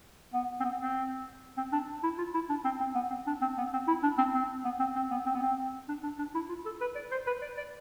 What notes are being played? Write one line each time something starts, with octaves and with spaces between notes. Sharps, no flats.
B3
C4
B3
C4
C4
D4
E4
F4
E4
D4
C4
C4
B3
C4
D4
C4
B3
C4
E4
D4
C4
C4
B3
C4
C4
B3
C4
B3
C4
D4
D4
D4
E4
F4
A4
B4
D5
C5
B4
D5
D5